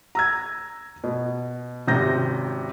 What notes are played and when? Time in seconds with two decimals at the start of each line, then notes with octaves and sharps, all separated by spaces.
0.15 A#5 E6 G#6
1.04 B2
1.87 G#1 C3 C#4 A#5 G6 A#6